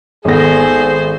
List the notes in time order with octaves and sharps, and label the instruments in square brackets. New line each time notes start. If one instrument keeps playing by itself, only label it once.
[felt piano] G#1 B3 A#6 [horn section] G#4 [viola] A4 C5